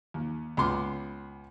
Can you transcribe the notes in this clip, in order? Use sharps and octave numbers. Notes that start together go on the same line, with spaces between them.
D#2
C#2 B3 C6 D6